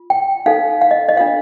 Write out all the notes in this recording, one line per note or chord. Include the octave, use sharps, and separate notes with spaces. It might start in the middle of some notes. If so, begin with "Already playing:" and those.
Already playing: F4
G5
D#4 A4 C5 F5
F5
D#5
D#5
D4 F4 A4 C5 F5